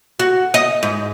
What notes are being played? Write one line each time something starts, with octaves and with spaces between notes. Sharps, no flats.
F#4
D#5
G#2